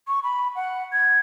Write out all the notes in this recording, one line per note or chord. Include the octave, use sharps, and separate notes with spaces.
C#6
B5
F#5
G#6